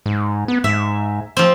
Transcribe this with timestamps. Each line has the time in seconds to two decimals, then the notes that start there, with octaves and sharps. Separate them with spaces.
0.06 G#2
0.48 B3
0.64 G#2 E5
1.37 F3 C4